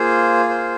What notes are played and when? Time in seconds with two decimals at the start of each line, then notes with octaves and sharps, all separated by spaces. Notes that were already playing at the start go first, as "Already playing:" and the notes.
Already playing: A#3 F4 G#4 C5
0.49 C5